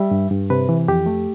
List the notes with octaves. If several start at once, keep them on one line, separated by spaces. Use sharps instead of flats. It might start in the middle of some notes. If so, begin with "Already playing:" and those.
Already playing: G3 E5
G2
G2
C3 B4
E3
F2 G4
A3